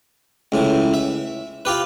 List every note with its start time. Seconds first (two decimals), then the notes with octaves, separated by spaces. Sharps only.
0.52 C#2 A2 E3
0.94 E5
1.65 F4 G4 B4